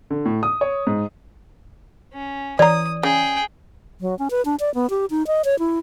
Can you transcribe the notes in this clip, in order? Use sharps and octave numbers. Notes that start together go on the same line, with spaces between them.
D3
A2
D#6
C#5
G#2
C#4
E3 C#5 D5 A#5 D#6
C#3 G#4 G5
F#3
C#4
B4
D4
D5
B3
G4
D#4
D#5
C#5
E4